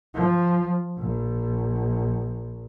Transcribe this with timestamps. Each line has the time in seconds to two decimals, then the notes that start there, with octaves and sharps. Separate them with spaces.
0.14 F3
0.97 A#1